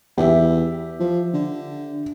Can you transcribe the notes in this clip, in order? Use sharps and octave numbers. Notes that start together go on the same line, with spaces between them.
E2 G4 E5
F3
D3